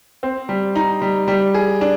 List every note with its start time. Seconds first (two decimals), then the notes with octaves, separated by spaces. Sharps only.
0.23 C4
0.49 G3
0.75 D#4
1.02 G3
1.28 G3
1.54 G#4
1.81 D4